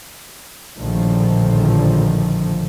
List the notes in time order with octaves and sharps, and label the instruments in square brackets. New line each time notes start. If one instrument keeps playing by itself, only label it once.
[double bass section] A#1 A2 D3 D#3 F3